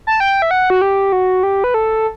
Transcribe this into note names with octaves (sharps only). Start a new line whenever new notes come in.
A5
G5
E5
F#5
F#4
G4
F#4
G4
B4
A4